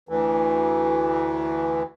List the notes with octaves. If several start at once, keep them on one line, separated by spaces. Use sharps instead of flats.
D2 E3